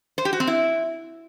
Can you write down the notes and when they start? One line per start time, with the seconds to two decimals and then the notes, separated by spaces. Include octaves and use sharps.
0.18 C5
0.25 G4
0.33 F#4
0.40 C4
0.47 E4